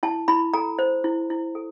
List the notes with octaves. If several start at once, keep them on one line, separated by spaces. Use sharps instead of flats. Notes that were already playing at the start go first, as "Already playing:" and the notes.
E4 A5
E4 B5
A4 A#5
C5
E4
E4
A4